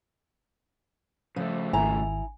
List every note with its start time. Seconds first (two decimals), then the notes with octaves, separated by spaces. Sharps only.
1.36 C#3 F3 A3
1.73 G#1 E4 G#5 A#5